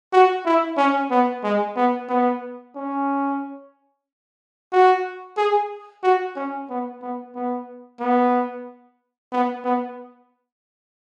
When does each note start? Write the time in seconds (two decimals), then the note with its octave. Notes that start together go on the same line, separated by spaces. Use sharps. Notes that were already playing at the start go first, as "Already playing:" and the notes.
0.13 F#4
0.45 E4
0.77 C#4
1.11 B3
1.43 G#3
1.76 B3
2.09 B3
2.75 C#4
4.72 F#4
5.37 G#4
6.03 F#4
6.36 C#4
6.70 B3
7.02 B3
7.35 B3
8.00 B3
9.32 B3
9.64 B3